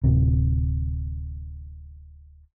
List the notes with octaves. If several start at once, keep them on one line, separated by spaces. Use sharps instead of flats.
D1 C3